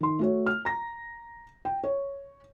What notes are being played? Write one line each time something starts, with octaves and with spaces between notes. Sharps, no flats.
D#3 C6
A3 F#4 C#5
F6
A#5 A#6
G5
C#5